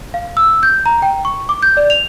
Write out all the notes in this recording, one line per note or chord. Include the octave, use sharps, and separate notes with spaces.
F5
E6
G6
A#5
G5
C#6
D6
G6
D5
F7